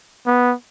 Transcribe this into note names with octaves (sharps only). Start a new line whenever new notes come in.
B3